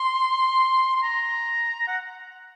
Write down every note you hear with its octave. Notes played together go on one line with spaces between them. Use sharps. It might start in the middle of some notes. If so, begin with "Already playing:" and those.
Already playing: C6
C6
A#5
F#5